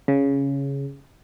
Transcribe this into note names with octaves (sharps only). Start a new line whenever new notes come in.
C#3